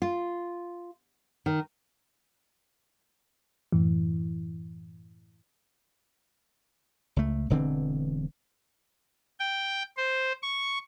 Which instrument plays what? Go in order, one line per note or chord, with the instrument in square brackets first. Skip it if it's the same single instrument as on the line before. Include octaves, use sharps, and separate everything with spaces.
[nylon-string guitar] F4
D#3
[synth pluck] F#2 A2 E3
[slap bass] C#2 A3
E1 D3 E3 C4
[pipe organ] G5
C5
C#6